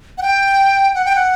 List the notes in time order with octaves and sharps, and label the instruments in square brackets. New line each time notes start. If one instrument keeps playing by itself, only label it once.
[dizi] F#5
G5
F#5
G5
F#5